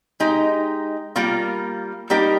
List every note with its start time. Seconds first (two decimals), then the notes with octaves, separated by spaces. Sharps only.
0.20 G#3 D#4 G4
1.16 G3 A#3 F4 A#4
2.10 G3 A#3 D#4 G4 A#4